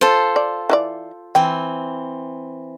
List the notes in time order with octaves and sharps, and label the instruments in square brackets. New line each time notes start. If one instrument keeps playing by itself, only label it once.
[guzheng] F4 [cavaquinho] A4 C5
[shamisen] D5
E3 E4 D5
[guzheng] E3 C4 [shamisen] G5